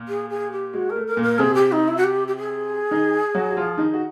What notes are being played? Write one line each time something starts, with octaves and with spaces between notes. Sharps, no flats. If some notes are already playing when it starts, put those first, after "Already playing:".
Already playing: A#2
G#4
G#4
G4
G#3 F#4
A#4
A3
A#4
A#2 A#3
A#4
C3 C4 G#4
G4
D#4
E4
F#4
G4
G4
G#4
D#3 D#4
F#3 F#4
F#4
F3 F4
D#3 D#4
F#4